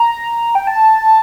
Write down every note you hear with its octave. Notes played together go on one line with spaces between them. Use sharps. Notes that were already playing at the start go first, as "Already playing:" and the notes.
Already playing: A#5
G5
A5